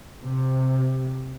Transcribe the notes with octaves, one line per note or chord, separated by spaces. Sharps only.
C3